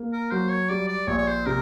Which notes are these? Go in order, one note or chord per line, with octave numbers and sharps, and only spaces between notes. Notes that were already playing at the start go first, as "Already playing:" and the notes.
Already playing: A#3
A#4
F#3 C5
C#5
G3 D5
D5
A#1 C#5
C#5
C5
C3 A#4